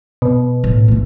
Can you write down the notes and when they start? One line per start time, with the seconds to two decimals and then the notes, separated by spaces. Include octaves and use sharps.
0.22 B2
0.64 A2
0.88 A#1 A3